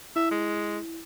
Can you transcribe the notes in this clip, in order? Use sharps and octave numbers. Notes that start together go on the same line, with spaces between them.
E4 E5
G#3